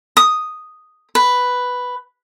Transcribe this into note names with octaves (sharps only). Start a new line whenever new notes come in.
D#6
B4